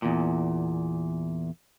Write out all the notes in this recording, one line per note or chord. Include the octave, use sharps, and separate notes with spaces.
E2 A#2